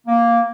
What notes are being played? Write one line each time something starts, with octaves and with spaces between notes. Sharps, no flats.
A#3